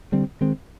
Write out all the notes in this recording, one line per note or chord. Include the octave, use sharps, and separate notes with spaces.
D3 G3 C4
D#3 G#3 C4